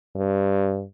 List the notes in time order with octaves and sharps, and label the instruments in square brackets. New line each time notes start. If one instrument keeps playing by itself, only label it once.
[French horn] G2